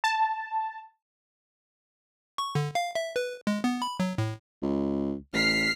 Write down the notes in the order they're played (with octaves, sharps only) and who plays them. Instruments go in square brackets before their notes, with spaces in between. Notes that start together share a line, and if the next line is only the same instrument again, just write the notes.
[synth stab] A5
[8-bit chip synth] C#6
D3
F5
E5
B4
G#3
B3
B5
F#3
A2
[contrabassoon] C#2
[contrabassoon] A1 [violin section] F6 B6 C7